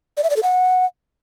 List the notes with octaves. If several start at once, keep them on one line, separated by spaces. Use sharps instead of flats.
D5
E5
D5
A4
F#5